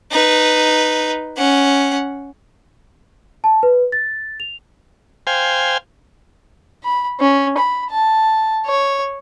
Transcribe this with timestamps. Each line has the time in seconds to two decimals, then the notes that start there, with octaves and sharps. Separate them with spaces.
0.11 D#4 B4
1.37 C#4 F#5
3.44 A5
3.63 B4
3.92 A6
4.40 F7
5.27 C5 F5 G5 G#5
6.84 B5
7.20 C#4
7.58 B5
7.91 A5
8.66 C#5